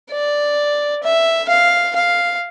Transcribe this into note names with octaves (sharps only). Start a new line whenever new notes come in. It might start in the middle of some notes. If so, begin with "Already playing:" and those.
D5
E5
F5
F5